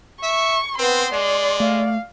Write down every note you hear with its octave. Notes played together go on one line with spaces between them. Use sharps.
E5 C#6
B3 C4 B4 C6
G#3 D5
A3 F5